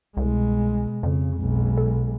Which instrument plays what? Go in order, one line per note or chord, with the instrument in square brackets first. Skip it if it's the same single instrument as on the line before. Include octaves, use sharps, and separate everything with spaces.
[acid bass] C2 [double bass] B2 G#3
[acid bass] F2 [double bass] C#3
[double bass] B1 G#3
[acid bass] A4